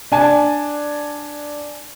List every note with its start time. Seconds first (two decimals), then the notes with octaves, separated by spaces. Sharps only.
0.12 D4 G#5 A5